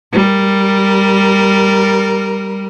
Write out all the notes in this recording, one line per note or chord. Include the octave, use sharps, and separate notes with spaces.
G3 A#4